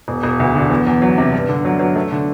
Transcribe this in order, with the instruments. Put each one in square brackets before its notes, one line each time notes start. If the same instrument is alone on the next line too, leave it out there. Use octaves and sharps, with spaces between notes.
[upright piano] E1
E1
D2
D3
E2
E2
F#3
C3
G2
D3
F#3
F#3
A3
D3